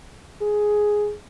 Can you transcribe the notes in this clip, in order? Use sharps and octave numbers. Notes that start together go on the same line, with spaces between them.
G#4